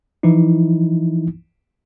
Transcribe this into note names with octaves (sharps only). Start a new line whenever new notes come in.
E3 F3 D#4 E4